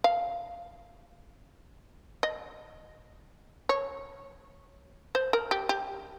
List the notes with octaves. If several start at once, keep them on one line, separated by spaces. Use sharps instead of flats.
F5
D#5
C#5
C5
A#4
G4
G4